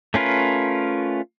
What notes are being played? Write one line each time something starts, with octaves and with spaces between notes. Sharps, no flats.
A3 C#4 F4 A#4 B4